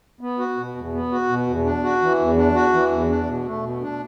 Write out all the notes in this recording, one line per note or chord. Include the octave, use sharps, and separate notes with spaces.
B3
F#4
B2
E2
B3
F#4
B2
E2
D4
F#4
E3
E2
D4
F#4
E3
E2
D4
B2
A3
B2
D4